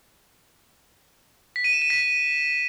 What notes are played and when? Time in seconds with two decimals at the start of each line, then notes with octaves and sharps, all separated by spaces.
1.56 B6
1.64 D#7
1.73 E7
1.82 D#7
1.90 B6